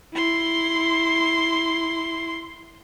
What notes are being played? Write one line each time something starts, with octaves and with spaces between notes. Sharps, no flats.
E4 C6